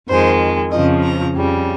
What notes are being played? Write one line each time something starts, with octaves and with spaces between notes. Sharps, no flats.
F2 D#3 G#3 C5
F2 C#3 F3 D#5
A#5
F2 C#3 G3